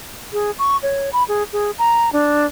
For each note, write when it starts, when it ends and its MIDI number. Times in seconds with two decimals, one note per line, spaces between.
0.33 0.51 68
0.59 0.77 85
0.83 1.10 73
1.13 1.24 83
1.28 1.43 68
1.53 1.71 68
1.79 2.12 82
2.13 2.46 62